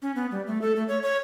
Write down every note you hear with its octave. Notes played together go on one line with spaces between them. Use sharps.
C#4
B3
G3
A3
A4
A3
C#5
C#5